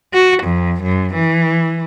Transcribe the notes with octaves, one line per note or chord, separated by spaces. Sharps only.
F#4
F2
F#2
E3